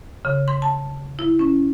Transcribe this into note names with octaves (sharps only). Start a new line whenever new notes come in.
C#3
C6
A5
E4
C#4